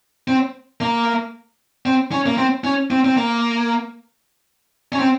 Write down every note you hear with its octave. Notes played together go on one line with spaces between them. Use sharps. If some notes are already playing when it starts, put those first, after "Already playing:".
C4
A#3
C4
C#4
A#3
C4
C#4
C4
C4
A#3
C#4
C4